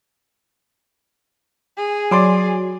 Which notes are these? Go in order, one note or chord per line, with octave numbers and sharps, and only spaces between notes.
G#4
F#3 D5 C6 D6